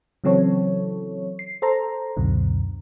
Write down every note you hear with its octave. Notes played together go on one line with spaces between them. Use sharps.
C#3 E3 F#3 C4 A4 C#5
C7
A4 C5 A#5
C#2 F#2 B2 D3